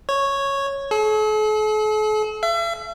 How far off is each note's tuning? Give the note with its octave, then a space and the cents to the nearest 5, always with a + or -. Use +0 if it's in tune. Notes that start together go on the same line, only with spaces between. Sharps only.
C#5 -5
A4 -45
E5 +40